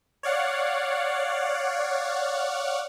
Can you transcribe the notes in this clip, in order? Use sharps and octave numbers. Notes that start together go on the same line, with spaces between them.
C#5 D5 F5 F#5